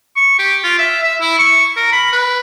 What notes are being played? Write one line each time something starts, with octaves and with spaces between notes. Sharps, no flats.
C#6
G4
F4
E5
E5
E4
C#6
A#4
B5
B4